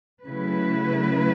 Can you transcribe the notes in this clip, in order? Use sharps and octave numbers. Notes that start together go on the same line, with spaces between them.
C#3 F#3 A3 E4 B4